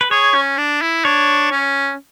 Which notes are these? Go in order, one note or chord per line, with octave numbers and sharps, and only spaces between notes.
B4
G#4 C#5
C#4
D4
E4
D4 C#5
C#4